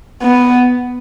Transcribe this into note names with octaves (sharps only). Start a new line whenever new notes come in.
B3